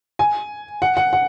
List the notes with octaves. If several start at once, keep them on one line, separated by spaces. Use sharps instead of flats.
G#5
F#5
F#5
F#5